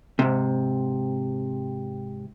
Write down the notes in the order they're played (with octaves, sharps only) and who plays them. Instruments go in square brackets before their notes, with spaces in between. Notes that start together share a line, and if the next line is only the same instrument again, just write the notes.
[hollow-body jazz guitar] G#2 C3